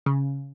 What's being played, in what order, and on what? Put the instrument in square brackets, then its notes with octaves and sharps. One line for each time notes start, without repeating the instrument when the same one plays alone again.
[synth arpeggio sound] C#3